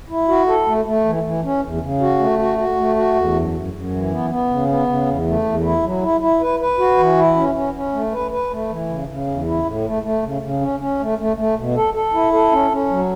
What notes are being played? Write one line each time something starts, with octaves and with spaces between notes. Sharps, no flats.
E4
F#4
A4
A3
A3
E3
E3
C#4
E2
C#3
F#4
A3
F#4
F#4
A3
F#4
E2
F#2
F#2
F#2
E3
B3
B3
C#3
B3
C#3
E2
A3
E2
E4
F#3
E4
E4
B4
B4
F#4
E3
E4
C#4
C#4
C#4
A3
B4
B4
A3
E3
C#3
C#3
E2
E4
A2
A3
A3
C#3
C#3
C#4
C#4
A3
A3
A3
B2
A4
A4
E4
A4
C#4
C#4
F#3